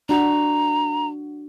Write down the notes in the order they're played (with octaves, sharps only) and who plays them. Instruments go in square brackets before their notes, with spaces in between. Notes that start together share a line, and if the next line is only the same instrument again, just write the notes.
[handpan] D4 F#4 [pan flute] A#5